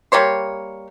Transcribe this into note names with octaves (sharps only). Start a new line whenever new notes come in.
G3 A#3 C#5 C6